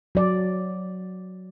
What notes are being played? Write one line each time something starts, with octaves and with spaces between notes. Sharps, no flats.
F#3 D5